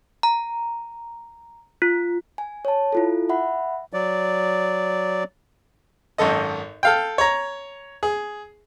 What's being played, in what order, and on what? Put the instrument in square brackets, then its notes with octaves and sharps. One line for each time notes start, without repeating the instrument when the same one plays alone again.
[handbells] A#5
F4
[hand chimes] G#5
C#5 A5
E4 F4 A4
E5 F#5 B5
[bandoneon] F#3 D5
[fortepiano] G#1 F#2 A4 D#5
A4 F5 G5
C#5 A#5
G#4